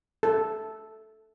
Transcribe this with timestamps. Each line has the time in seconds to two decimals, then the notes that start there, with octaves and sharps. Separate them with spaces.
0.23 A4